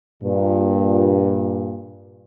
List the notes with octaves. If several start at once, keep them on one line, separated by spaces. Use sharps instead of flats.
G2 A#2